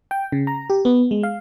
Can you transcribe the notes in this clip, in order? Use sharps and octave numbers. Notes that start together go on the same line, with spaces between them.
G5
C#3
A#5
G4
B3
G#3
F5